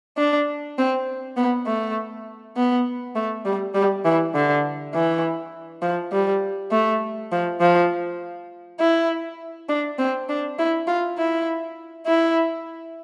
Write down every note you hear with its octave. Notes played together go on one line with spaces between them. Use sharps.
D4
C4
B3
A3
B3
A3
G3
G3
E3
D3
E3
F3
G3
A3
F3
F3
E4
D4
C4
D4
E4
F4
E4
E4